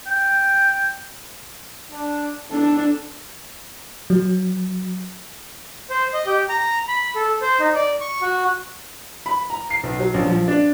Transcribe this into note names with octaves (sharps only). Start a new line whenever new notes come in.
G5
D4
D4 A4
F#3
C5
D#5
G4
A#5
B5
A4
C5
D#4
D5
C#6
F#4
B5
A#5
C7
B1
F#3
A#1
F3
D4